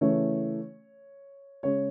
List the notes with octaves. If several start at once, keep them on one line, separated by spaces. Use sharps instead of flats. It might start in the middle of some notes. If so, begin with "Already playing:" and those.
C#3 E3 A3 C#5
C#3 G#3 C#5